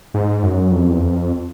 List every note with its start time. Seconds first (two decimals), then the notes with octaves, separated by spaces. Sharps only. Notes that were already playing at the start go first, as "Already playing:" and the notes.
0.14 G#2
0.43 F#2
0.72 F2
0.91 E2
1.01 F2